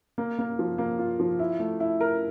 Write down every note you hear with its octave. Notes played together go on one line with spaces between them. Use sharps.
A#3
A#3
F3
A#3
F4
F3
E4
A3
E4
A#4